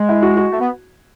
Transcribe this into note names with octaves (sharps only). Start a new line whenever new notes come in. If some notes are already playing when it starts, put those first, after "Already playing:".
Already playing: G#3
E4
F#4
F#4
A3
B3